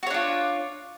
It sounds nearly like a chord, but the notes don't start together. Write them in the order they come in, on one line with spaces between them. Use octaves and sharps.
F#4 C#5 D4 F4